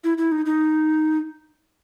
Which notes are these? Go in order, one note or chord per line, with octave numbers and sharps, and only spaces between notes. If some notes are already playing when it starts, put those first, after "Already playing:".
E4
E4
D#4
D#4